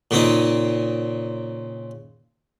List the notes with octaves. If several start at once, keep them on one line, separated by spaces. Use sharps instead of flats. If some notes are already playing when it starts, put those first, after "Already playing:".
A#2 C#3 C4 D#4